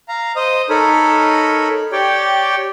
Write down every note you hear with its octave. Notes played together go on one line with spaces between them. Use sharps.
F5 A#5
C5 D#5 D#6
D#4 A4 A#4 C#5 B5
G4 C#5 D5 G5